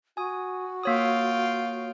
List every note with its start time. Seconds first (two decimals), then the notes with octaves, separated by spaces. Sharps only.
0.17 F#4 G#5 D#6
0.83 A#3 F4 C#5 F5 G5 D#6